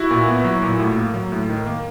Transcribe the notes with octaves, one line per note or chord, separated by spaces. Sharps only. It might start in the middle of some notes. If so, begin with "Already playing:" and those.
Already playing: E4 F#4
A#2
B3
F#3
A#2
A2
A#3
F#3
A2
D#3
A#3